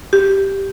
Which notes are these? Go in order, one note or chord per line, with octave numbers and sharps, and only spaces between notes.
G4